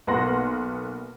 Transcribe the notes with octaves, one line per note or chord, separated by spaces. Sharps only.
B1 A#3 B3 F#5 C6 A#6